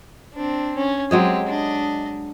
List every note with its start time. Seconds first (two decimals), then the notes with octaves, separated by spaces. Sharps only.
0.33 C4 D4
0.76 C#4
1.11 F#3 G#3 C4 G4 G#4
1.47 D4 D#5